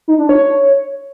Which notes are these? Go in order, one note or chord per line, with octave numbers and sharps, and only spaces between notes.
D#4
D4
C#5